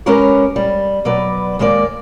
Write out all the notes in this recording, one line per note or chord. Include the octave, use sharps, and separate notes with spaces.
G#3 C#4 G4 A#4 B4 C#5
G3
B2 F#3 B4 D5
D#2 G#3 A#3 C#5 D5